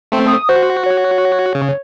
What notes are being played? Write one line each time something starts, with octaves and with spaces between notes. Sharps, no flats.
A3 C4
D#6
F#4 C5
C#5
C#3